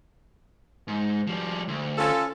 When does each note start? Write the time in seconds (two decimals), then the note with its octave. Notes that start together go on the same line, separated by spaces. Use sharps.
0.88 G#2
1.27 F3 G3
1.68 D2
1.98 C#4 F4 A4